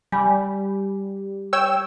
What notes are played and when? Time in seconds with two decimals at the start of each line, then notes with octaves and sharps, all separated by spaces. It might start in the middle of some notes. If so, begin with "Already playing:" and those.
0.12 G3 G#5 B5
1.53 C#5 G5 E6